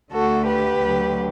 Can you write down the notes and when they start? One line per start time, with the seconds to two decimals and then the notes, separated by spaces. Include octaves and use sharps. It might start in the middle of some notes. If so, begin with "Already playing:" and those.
0.12 D2 D3 A3 F#4 A4
0.46 G4 B4
0.81 D2 D3 F#3